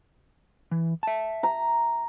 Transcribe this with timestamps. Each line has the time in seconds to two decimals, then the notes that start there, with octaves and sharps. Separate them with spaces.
0.71 E3
1.03 E5 A5
1.43 A#5